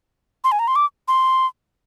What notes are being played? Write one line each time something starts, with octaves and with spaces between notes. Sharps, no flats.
C6
G#5
A#5
C6
D6
C6